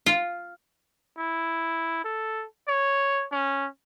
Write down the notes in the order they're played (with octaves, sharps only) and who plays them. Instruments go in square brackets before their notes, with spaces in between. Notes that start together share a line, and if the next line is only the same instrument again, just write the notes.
[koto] F4
[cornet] E4
A4
C#5
C#4